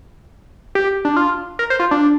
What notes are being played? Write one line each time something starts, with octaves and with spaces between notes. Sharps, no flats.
G4
D4
F4
A#4
C5
F4
D4